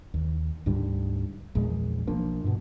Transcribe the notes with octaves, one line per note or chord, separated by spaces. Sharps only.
D#2
D2 G#2 D3 G3
A#1 E2 G#3
B1 F3 A#3 D4
G2 B2